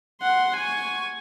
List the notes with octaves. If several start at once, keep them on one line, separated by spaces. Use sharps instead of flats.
F#5 C6
G#5 C#6